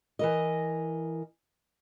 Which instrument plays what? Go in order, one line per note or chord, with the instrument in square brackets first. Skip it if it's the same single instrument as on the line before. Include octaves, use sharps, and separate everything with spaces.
[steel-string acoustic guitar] E3 A#4 D#5